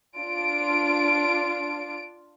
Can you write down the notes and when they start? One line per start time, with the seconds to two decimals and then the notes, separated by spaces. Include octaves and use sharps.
0.19 D4 F4 D7